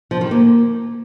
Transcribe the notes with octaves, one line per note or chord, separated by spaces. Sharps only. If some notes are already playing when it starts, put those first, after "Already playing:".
F3
D#3
A#3